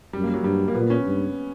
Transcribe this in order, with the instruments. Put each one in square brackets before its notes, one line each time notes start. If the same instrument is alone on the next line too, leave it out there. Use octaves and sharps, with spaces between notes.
[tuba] F#2 [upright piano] G3
[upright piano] A#3
F#3
[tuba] G2 [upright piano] G3
[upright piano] A#3
[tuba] A#2 [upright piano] B3
[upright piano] C#4
[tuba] G2